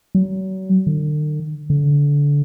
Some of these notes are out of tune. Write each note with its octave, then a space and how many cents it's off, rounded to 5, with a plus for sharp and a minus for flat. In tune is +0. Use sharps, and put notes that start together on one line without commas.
F#3 +35
D3 +45
D3 -25